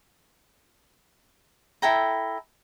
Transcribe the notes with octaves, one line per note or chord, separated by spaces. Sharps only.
E4 A4 G5 A#5